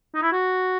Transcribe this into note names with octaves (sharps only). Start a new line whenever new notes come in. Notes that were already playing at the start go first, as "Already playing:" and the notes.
D#4
E4
F#4